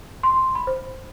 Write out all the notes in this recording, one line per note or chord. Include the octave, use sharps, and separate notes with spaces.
C6
B5
C5